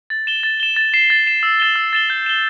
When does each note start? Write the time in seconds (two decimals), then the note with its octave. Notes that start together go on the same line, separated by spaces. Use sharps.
0.10 A6
0.27 E7 G7
0.43 A6
0.60 E7 G7
0.76 A6
0.94 C7 E7
1.10 A6
1.26 C7 E7
1.43 E6
1.60 A6 E7 G7
1.76 E6
1.93 A6 E7 G7
2.10 G6
2.26 E7 G7